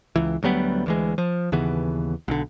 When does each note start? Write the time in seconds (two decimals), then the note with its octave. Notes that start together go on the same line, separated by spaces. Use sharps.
0.16 C#2 E3
0.43 D2 F#3 G3 B3
0.86 D2 E3 G#3
1.18 F3
1.52 D#2 C#3 E3 B3
2.28 B1 D3